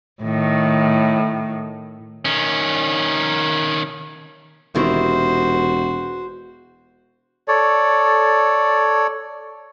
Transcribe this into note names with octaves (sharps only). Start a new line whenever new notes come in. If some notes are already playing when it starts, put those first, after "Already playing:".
A2 D#3
D#3 C#4
E1 C3 D#3 E4 F#4 C5
A4 C#5 D5